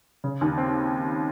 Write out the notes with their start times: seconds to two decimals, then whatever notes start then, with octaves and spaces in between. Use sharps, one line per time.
0.24 C#3
0.41 D#2
0.58 C4